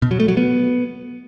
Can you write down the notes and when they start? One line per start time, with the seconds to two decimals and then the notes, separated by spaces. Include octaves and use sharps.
0.02 B2
0.11 F#3
0.20 A3
0.28 F#3
0.37 B3